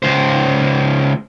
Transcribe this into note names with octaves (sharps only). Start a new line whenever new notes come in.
C#2 C5